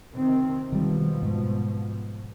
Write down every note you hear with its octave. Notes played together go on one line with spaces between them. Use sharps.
C3 D#3 C4
B2 D#3 F3 G3
G#2